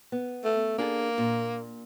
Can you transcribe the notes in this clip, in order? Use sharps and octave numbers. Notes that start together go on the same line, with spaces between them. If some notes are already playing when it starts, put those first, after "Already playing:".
B3
A3
A#3 D4 G#4 A4
A#2